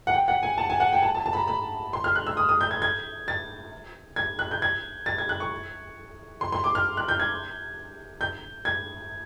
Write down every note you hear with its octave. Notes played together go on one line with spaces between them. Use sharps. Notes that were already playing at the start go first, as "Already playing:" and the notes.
F#5
G5
F#5
G#5
A5
G#5
F#5
G5
A5
A5
A5
B5
A#5
B5
C6
F6
F#6
E6
D#6
D#6
G6
G#6
G#6
A6
G#6
F#6
G6
G#6
A6
G#6
F#6
C#6
C6
C6
D6
F6
F#6
G6
G#6
G6
G#6